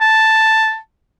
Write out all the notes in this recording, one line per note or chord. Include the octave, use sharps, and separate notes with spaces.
A5